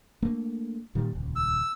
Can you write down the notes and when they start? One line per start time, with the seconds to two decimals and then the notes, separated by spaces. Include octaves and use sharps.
0.22 A3 A#3 D4
0.95 A#2 D#3 G3
1.13 D#1 C#2
1.36 E6